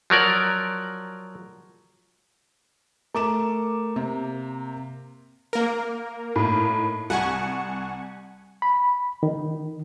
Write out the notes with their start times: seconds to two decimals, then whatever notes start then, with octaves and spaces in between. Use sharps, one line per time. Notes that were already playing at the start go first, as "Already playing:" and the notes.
0.10 F3 F#3 A#4 D5
3.15 A3 A#4 D6 E7
3.96 C3 A#3
5.53 A#3 A#4
6.36 A2 D#4
7.10 C2 F#5 G#5 C#6
8.62 B5
9.23 D#3